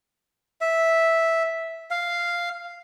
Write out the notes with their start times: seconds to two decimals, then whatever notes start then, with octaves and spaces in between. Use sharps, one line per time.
0.61 E5
1.91 F5